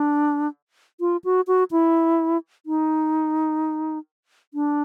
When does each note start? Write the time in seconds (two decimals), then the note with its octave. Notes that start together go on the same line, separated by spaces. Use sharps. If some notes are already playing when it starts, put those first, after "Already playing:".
Already playing: D4
1.00 F4
1.24 F#4
1.47 F#4
1.71 E4
2.66 D#4
4.54 D4